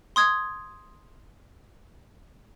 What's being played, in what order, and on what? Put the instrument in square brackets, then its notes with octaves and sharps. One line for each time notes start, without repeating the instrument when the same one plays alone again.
[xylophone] C6 D#6 G#6